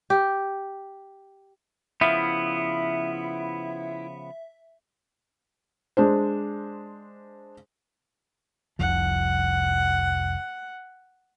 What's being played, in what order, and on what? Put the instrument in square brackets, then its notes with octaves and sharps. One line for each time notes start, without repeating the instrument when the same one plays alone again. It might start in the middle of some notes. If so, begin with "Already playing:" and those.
[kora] G4
[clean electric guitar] C#3 F3 B3 [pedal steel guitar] E4 [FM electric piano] E5
[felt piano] G#3 D4 C5
[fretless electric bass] F1 C2 F3 [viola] F#5